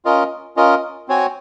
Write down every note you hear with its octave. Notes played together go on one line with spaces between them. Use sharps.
C#4 F4 A#4 D#5
C#4 F4 A#4 D#5
C4 F#4 C#5 G#5